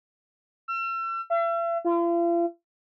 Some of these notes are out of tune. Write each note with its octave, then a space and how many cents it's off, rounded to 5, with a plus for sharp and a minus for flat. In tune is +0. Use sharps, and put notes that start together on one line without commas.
E6 +40
E5 +40
F4 -40